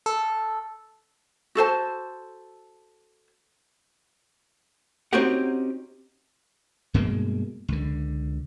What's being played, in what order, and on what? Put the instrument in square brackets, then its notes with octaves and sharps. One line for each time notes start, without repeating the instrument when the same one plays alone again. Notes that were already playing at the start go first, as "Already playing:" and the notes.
[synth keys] A4
[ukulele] F#4 A4 C5 A5
[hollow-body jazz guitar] C4 C#4 D#4 F#4 G4 F#5
[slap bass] G2 B2 G#3 A#3
C#2 D3